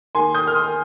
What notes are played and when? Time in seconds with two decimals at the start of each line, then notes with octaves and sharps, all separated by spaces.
0.15 D#2 G#5 C6
0.35 D#6 G6
0.45 D#3 F6
0.55 C6 D#6